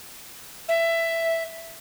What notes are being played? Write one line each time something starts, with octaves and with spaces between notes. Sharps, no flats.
E5